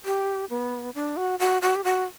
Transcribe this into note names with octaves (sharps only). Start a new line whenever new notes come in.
G4
B3
D4
F#4
F#4
F#4
G4
F#4